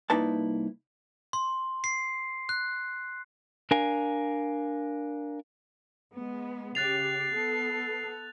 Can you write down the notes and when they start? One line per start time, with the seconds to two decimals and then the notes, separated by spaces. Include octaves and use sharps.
0.10 C2 A#3 D#4 E4 B4 A5
1.33 C6
1.84 C7
2.49 F#6
3.71 D4 A#4 F5 G#5
6.15 G#3 B3
6.75 C#3 G4 F#6 A6 C7 F7
7.32 B3 A4